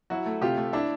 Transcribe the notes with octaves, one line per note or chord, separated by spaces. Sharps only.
F#3 E4 F#4
A3
C3 F4 G4
A3
D4 E4